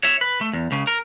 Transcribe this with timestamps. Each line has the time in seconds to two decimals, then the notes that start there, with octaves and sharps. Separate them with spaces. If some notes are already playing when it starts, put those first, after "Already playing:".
0.03 C#5 E5
0.21 B4
0.41 A3
0.53 E2
0.71 C#2 C#3
0.87 A#4